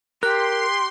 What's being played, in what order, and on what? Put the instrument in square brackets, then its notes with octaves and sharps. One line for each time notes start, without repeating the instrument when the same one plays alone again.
[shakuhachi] G4 [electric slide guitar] A#4 [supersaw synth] C6 [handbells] F#6